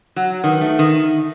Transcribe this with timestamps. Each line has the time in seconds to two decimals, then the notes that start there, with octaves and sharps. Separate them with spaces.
0.16 F#3 F#5
0.43 D#3 B4
0.61 A3
0.70 D#4
0.79 D#3